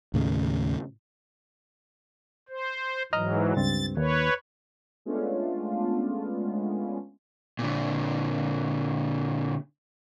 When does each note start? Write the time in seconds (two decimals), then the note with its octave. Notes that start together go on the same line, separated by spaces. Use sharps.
0.14 D#2 A2 C#3
2.49 C5
3.13 G#2 E3 F#3 D#5 A#5 F6
3.57 C#2 G2 C4 A6
3.97 D#2 B4 C#5
5.05 G#3 A3 B3 C#4 D4 F4
7.59 A#2 D3